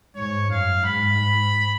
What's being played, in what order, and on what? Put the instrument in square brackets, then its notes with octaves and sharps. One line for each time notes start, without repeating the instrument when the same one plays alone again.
[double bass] G#2 [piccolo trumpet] C#5
[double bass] F#2 [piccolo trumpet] F5
[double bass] G#2 [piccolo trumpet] B5